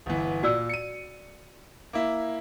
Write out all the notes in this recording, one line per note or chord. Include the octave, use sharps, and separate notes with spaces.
G1 E3
A#2 F#4 D5 E6
C#7 D#7
A#3 E4